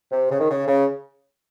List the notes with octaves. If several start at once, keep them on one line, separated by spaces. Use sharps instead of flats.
C3
C#3
D#3
C#3
C#3